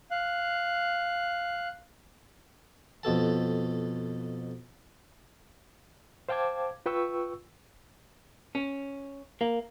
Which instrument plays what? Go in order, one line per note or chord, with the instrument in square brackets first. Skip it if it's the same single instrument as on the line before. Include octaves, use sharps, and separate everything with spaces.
[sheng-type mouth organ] F5 F#6
[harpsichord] F2 B2 A4 A5
[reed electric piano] C5 F5 G5 A5 D6 G#6
F4 B4 G5 C#6 E6
[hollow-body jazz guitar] C#4
A#3